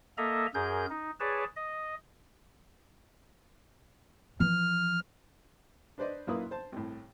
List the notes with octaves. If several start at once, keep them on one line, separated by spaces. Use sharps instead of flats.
A#3 A4 D#5 E5 A#5
F#2 G#4 A#4 G6
D#4
G#4 B4 C#5 D5 A5
D#5
E3 F3 F6
D4 B4 C5 D5 D#5
F#2 A#2 A#3 E4 B4 D#6
C5 A5
C2 A2